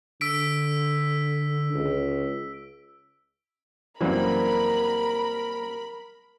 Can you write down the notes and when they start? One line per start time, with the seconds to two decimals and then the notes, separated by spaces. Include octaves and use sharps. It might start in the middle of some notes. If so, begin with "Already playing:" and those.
0.21 D3 E6 B6 D7
1.74 C#2
4.01 F#2 E3 G3 A#3 C4 A#4 B5